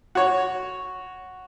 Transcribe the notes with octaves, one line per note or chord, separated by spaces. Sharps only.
F#4 C#5